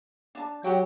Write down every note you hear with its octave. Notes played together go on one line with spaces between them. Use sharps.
D4 A5
F#3 G4 G5